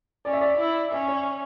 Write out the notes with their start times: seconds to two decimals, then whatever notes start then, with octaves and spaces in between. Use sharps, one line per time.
0.25 C#4 D5
0.33 E5
0.41 D5
0.58 E4
0.92 C#4 E5
1.08 C#5